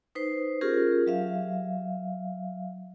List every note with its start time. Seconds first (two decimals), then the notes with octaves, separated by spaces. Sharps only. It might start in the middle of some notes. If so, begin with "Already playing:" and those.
0.15 D#4 B4 C5
0.61 C#4 F4 G4 G#4 A#4
1.06 F#3 E5 F5